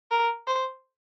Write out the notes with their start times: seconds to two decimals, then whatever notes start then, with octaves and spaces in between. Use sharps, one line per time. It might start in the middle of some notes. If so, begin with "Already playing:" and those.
0.11 A#4
0.47 C5